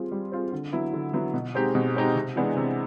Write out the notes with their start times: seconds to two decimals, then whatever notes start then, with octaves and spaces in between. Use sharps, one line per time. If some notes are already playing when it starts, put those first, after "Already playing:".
Already playing: G3 C4 F4 G#4
0.12 G3
0.32 C4 F4 G#4
0.52 D3
0.73 F#3 B3 E4
0.94 D3
1.13 F#3 B3 E4
1.34 B2
1.54 G#3 C4 D#4 G4
1.75 B2
1.95 G#3 C4 D#4 G4
2.15 C3
2.36 E3 G#3 B3 D4
2.57 C3